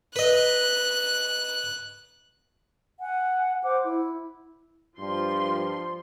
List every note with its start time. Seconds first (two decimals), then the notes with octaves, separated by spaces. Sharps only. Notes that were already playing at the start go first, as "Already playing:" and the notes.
0.16 B4 D#5 F#6
3.00 F#5 G#5
3.63 C5 F#5 D6
3.84 E4
4.99 G2 F3 C6